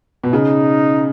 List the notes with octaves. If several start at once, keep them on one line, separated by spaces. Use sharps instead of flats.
B2
C#3 D#4